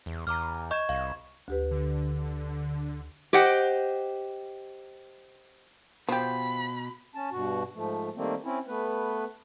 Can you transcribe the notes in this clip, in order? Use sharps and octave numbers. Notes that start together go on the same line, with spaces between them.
E2
E2 A#5 D6 F6
D#5 C#6 G6 G#6 E7
C2 F5
D2 G4 B4
D3
G4 C5 D#5 F#5 G5
B2 F3 G4 B5
C#4 A5
G2 B2 F#4
G#2 F3 A3
D#3 G3 A3 A#3 C4
C4 C#4 E4
A3 B3 B4